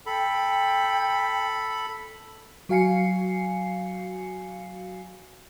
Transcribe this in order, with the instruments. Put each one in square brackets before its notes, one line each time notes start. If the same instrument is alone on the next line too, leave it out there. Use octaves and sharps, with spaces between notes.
[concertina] A4 B5 [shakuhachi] G5
[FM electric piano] F#3 F#4 F5 G#5 C7 C#7